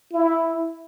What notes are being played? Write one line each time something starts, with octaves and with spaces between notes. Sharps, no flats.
E4